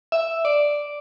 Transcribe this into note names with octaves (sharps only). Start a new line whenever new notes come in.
E5
D5